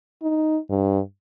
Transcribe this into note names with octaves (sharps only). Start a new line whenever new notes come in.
D#4
G2